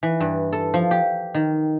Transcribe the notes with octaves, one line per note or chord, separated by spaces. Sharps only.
E3
G2
A4
F3
G4
D#3